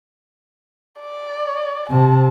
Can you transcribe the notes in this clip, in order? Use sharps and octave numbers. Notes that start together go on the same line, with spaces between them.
D5
C3 A5